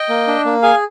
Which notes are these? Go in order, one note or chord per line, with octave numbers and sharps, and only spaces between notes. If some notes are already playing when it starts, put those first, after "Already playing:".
Already playing: D#5 G5
A#3
D4
A#3
G#4 F5 G#5